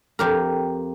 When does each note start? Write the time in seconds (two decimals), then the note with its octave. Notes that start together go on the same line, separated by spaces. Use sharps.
0.19 F2 G4 A#4